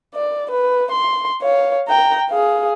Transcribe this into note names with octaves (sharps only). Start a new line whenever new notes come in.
D5
B4
C6
C#5 F5
G5 A#5
G#4 F5